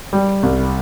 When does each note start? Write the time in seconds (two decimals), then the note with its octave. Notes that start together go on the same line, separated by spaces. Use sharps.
0.13 G3
0.43 C2